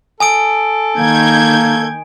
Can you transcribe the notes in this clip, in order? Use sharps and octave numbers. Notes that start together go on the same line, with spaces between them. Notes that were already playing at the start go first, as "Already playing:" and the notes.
A4 G#5 D#6 D7
D#3 A#3 G6 G#6